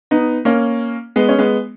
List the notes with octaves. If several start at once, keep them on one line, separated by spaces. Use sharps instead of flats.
B3 D#4
A#3 C#4
G#3 B3
C#4
G#3 B3